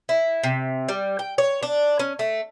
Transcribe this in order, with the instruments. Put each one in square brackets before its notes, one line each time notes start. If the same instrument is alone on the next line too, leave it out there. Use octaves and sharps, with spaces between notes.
[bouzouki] E4
C3
G3
G5
C#5
D4
C#4
A3